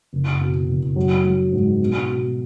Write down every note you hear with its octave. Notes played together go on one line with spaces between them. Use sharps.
F#1
B2
F#1
F#3
F#3
G#2
B2
B2